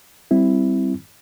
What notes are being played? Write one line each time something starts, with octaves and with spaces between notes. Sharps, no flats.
G3 C4 E4